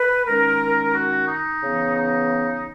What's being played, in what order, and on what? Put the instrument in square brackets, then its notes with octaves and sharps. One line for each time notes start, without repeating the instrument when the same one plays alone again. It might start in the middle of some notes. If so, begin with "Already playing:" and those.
Already playing: [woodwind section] B4
D#3 G#3 C#4 A#4
F#4
D#4
C#3 E3 B3
D#4